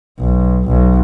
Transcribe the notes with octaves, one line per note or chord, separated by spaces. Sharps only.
B1
B1